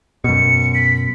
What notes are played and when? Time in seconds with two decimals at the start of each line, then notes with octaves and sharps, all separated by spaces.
0.24 F#2 B2 C#7
0.75 B6